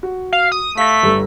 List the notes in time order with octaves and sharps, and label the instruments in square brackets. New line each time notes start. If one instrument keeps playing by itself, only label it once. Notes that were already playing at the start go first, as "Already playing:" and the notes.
[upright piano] F#4
[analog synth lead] F5
D#6
[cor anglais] A3 [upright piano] F5 A#6 [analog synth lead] B6
[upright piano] G1 G3 A4